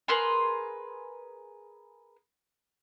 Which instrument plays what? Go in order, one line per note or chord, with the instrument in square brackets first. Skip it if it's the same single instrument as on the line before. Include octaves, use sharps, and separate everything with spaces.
[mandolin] G#4 A#4 B4 C6